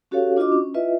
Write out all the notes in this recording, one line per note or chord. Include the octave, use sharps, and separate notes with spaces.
C#4 F#4 G4 A4 C#5 F5
D4 F4 F#4 D#5 D6
C#4
E4 F4 B4 D#5 E5